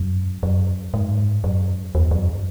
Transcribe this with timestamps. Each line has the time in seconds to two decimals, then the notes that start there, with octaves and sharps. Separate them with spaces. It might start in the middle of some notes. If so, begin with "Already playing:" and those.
Already playing: F#2
0.43 F#2
0.94 G#2
1.44 F#2
1.95 E2
2.11 F#2